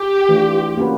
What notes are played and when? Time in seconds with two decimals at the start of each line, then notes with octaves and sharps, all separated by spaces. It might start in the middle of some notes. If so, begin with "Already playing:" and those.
Already playing: G4
0.29 E3 A3 D4 F4
0.77 A#3 C#4 F#4 B4